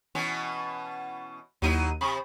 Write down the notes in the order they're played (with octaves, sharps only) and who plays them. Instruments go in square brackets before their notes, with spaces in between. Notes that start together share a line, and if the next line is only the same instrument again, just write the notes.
[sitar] B2 E3 C#4
[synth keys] D#2 D#7 [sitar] F#3 D#4 E4
[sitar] C3 [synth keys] B5